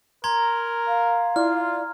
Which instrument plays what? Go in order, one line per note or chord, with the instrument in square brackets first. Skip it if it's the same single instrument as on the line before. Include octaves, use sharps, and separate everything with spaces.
[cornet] A#4 [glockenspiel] A#5 C6 G#6
[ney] F5
[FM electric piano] E4 D5 [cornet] F4 [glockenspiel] F6